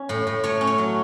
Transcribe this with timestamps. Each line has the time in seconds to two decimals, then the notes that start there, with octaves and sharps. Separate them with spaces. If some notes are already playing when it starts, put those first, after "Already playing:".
Already playing: C#4
0.09 A2
0.27 A2
0.44 A3 C#5
0.61 C#4
0.67 C#5
0.78 F#3